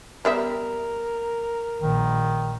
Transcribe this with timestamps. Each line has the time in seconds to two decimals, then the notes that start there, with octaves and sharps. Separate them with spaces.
0.25 G3 B3 A#4 E5
1.81 A#1 D#3